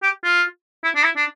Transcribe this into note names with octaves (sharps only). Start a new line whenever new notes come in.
G4
F4
E4
D4
E4
D4